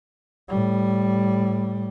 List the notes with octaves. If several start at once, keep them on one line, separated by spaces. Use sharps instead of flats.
A2 G3